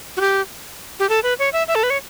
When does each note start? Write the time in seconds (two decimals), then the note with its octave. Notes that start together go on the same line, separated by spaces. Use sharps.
0.17 F#4
0.21 G4
1.00 G4
1.09 A4
1.23 B4
1.39 C#5
1.53 E5
1.68 E5
1.75 A4
1.83 B4
1.90 C#5